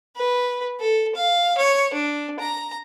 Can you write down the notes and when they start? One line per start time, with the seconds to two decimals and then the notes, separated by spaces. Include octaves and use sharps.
0.16 B4
0.80 A4
1.15 F5
1.58 C#5
1.93 D4
2.40 A#5